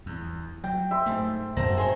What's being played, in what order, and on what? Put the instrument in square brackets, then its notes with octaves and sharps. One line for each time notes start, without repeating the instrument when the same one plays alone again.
[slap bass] E2
[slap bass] F#3 [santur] G5
[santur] E5 C6
[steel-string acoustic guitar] G#2 [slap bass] A3
[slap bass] F#2 [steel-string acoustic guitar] C4 F#4 A4 [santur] A#5
[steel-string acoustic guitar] G#4 C5 C#5